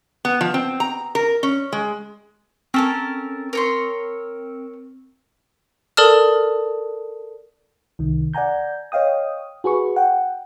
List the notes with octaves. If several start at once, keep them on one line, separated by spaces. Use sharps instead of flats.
B3
F3
C4
A#5
A#4
C#4
G#3
C4 C#4 A4 A#4
A#4 C#5 C6
A4 A#4 D5 A5 D#6 F6
C2 D#3
D5 F#5 G#5 A#5 G6
C#5 D#5 F5 G5 D#6
F#4 G#4 B4 C#6
F#5 G5